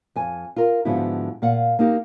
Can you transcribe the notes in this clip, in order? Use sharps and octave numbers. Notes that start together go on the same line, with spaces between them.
F2 G#5
F4 A#4
G#2 D3 F3 B3 E4 F#4
A#2 F5 F#5
A#3 D#4 G4